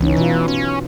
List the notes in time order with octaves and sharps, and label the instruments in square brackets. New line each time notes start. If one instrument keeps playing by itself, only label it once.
[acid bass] C#2 [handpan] E3 C#4 D#4
[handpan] B2 F4 [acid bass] E3
[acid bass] C#4